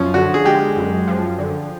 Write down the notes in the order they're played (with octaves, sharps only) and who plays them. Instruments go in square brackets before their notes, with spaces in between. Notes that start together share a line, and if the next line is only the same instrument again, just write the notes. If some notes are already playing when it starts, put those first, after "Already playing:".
Already playing: [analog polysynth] F#2 F3 [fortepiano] C#4
[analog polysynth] D3 [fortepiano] F#4
[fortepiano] G#4
[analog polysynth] G#3 [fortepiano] G4
[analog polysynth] F#2
F3
D3